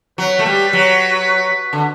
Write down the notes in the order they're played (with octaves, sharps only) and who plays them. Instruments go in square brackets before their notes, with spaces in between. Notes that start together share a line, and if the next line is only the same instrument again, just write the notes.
[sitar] F#3 [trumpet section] B4
[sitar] A3
G3
F#3
D3